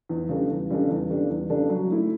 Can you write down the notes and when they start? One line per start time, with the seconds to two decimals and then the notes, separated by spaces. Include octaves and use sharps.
0.09 E2
0.29 C#3 G3 D4 A4
0.50 E2
0.70 C#3 G3 D4 A4
0.90 E2
1.10 C#3 G3 D4 A4
1.30 E2
1.49 C#3 G3 D4 A4
1.69 F#3
1.90 A3 E4